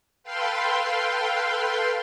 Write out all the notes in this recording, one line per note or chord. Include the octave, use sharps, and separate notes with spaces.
A4 B4 F5 G5 C6